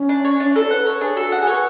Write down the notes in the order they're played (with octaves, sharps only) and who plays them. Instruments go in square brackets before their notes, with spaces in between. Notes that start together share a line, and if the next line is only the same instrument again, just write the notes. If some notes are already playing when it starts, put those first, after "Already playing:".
Already playing: [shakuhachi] C#4
[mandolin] D4
C#5
D4
A4
[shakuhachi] C#5
[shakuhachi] B4 [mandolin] F#5
[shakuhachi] A4 [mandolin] C#5
[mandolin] D4 [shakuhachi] G#4
[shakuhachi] F#4 [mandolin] A4
[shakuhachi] F#4 [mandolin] F#5
[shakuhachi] G#4
[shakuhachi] B4 [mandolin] C#5